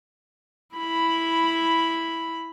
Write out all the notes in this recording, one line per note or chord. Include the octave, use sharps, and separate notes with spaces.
E4 B5